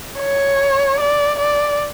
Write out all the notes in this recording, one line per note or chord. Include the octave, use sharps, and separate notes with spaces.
C#5
D5
D5